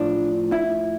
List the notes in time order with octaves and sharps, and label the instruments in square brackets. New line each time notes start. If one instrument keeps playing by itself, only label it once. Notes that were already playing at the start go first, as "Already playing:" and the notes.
Already playing: [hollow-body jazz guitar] A2 F3 D4
E4